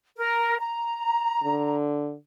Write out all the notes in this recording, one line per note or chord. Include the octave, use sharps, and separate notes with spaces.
A#4
A#5
D3